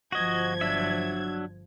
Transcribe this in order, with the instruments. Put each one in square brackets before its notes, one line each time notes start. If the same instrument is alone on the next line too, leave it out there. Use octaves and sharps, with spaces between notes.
[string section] G1 F3 G#6 [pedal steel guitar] F#4 D#5
[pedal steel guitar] F#3 D4 E5